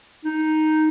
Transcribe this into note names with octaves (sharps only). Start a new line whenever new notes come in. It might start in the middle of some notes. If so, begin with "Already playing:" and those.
D#4